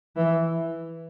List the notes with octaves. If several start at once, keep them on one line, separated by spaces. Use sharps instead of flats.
E3